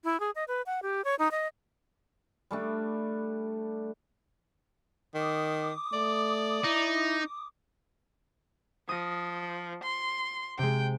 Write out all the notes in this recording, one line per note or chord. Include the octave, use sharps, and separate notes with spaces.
E4
G#4
D#5
B4
F#5
G4
C#5
D#4
D#5
G3 A3 D4
D#3 D6 D#6
A3 D5
D#4 E4
F3 D#6 A#6
C6
C3 G#3 G5